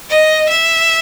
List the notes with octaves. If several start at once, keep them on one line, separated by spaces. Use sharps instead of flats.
D#5
E5